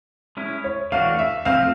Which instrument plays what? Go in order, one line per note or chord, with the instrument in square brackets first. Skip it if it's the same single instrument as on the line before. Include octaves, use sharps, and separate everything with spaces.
[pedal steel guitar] G#3 C#4 E4
[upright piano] C#5
[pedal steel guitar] E3 A3 D4 F#4 [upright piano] F5
[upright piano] E5
[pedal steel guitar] F3 A3 C4 [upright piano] F5